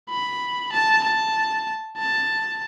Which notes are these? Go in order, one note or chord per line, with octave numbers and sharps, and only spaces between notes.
B5
A5
A5
A5